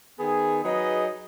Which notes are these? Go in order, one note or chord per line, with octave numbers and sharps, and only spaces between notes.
D#3 B3 G#4
F#3 D#4 G#4 B4 D#5